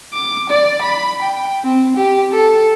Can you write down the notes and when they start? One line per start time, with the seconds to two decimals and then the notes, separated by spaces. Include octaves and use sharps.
0.13 D6
0.50 D5
0.82 B5
1.22 G5
1.64 C4
1.97 G4
2.33 A4